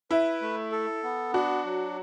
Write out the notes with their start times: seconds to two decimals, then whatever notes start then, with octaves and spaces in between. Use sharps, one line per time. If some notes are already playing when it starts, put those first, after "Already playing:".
0.11 E4 B4
0.41 A3
0.72 A4
1.03 B3
1.33 D4 F#4
1.65 F#3